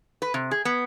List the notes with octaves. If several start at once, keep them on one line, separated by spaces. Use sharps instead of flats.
B4
C3
G#4
B3